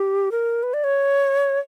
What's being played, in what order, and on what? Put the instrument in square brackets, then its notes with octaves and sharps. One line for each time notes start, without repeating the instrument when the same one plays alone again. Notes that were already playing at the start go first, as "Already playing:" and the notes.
Already playing: [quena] G4
A#4
B4
D5
C#5